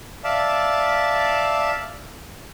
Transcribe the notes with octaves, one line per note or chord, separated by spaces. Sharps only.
D5 E5 F5 A5